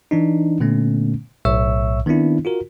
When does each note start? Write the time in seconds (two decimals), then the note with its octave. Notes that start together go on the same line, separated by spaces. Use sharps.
0.11 E3 D4 D#4
0.60 A#2 D3 A3 B3 C#4
1.45 B1 A2 C#5 E5 C#6 E6
2.06 D#3 B3 C4 D4 E4
2.45 F4 F#4 A#4